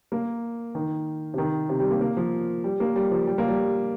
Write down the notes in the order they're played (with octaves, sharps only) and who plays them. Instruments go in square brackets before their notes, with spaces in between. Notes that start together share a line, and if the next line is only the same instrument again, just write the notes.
[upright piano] A#3
D#3
C3
D#3
C3
G3
A#3
A#3
F3
G3
A#3
G3
F3
G3
A#3
G3